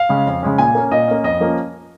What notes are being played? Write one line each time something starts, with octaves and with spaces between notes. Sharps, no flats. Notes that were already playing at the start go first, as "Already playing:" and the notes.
Already playing: F5
C#3 G#3 C#4
F2
C#3 G#3 C#4
A#2 G#5
A#3 C#4
A#2 D#5
A#3 C#4
F2 D#5
F3 A#3 C#4